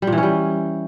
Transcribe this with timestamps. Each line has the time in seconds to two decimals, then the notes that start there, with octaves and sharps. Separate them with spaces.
0.02 G3
0.07 A#2
0.12 E3
0.18 C#4
0.23 G3